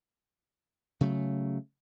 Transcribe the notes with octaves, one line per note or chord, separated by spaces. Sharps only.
C#3 F#3 A3